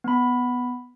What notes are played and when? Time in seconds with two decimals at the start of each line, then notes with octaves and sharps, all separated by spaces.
0.04 B3 B5